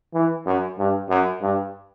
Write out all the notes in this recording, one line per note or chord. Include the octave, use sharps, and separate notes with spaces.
E3
F#2
G2
F#2
G2